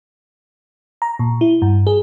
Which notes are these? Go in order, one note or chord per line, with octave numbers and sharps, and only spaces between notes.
A#5
A#2
E4
G2
G#4